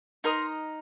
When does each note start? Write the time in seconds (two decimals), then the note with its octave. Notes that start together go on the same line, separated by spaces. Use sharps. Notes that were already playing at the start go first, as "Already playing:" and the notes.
0.24 D#4 A#4 D#5 C6